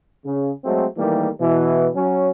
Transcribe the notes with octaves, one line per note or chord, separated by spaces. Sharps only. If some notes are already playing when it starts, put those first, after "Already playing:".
C#3
F#3 G#3 A3 C4
D#3 E3 G3 A3 A#3
B2 E3
F#3 C#4